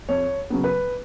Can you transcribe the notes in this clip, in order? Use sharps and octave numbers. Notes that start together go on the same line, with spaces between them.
F2 C#5
C#3 F#3 B3
B4